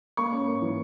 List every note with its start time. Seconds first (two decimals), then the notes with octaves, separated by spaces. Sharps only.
0.17 A#3 C#6
0.32 C#4
0.48 A#3
0.62 E3